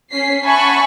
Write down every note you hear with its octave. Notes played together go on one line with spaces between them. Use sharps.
C#4 B6 C7
E5 F#5 G#5 A5 B5 C#6